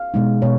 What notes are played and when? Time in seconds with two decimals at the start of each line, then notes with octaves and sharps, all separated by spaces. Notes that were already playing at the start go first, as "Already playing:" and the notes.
Already playing: F5
0.14 B2 G#3 D#4
0.42 B2 C#5